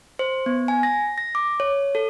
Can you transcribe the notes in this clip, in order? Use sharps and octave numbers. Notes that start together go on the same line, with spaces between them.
C5
B3
G#5
A#6
A#6
D6
C#5
A4